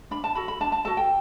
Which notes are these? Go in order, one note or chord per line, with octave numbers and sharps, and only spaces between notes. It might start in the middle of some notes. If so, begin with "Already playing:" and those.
D4 B5
A5
F#4 A4 B5
B5
D4 A5
A5
F#4 A4 A5
G5